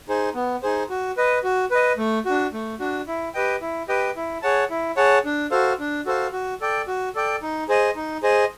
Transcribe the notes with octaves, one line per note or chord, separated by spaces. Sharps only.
D#4 G#4 C5
B3
D#4 G#4 C5
F#4
B4 D#5
F#4
B4 D#5
A3
D4 F#4
A3
D4 F#4
E4
G4 B4 D#5 G5
E4
G4 B4 D#5 G5
E4
G#4 C#5 F#5 A5
E4
G#4 C#5 F#5 A5
D4
F#4 A4 C5 F5
D4
F#4 A4 C5 F5
F#4
A4 D5 G5
F#4
A4 D5 G5
D#4
G#4 C5 D#5
D#4
G#4 C5 D#5